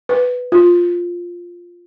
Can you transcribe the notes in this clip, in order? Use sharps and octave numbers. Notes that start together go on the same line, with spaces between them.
B4
F4